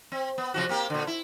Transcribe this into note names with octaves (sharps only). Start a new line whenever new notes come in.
C4
B3
C3 F3 F#4
A#3 C4 G4
A#2 D3
E4